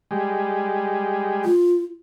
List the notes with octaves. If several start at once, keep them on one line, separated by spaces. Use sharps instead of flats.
G3 G#3
F4